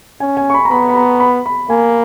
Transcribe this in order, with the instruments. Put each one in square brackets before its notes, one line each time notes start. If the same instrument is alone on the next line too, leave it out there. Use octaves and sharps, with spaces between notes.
[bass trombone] C#4 [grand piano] G#5
[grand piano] G#5
C#6
B5
A#5
[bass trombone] B3 [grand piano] B5
[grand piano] B5
A#5
B5
B5
[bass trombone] A#3 [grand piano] G#5